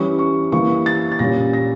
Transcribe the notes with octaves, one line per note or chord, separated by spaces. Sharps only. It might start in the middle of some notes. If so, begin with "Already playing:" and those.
Already playing: E3 G3 C#4 C#6
C#6
E3 G3 A#3 C#6
A6
A6
A#2 G3 C#4 A#6
A#6